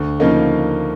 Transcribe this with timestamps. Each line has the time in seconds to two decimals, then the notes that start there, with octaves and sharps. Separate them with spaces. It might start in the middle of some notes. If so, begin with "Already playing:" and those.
Already playing: D2
0.20 C#3 F3 A#3 D#4